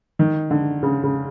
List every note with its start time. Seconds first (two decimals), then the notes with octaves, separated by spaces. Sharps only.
0.19 D#3
0.51 D3
0.83 C#3
1.04 C#3